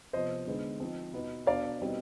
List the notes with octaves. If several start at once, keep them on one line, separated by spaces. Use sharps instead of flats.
C3 F3 B3 C5 D#5
D3 G#3 B3 D#4
F3 C4 D#4
B2 B3 D#4
B2 B3 D4 D5 F5
B2 G3 C4 D#4